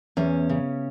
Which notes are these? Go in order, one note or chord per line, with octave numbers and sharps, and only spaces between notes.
E2 C#4
C#3